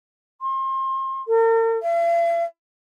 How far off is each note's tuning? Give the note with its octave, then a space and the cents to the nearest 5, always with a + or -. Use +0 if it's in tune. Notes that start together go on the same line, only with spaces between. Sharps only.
C6 +35
A#4 -45
E5 +45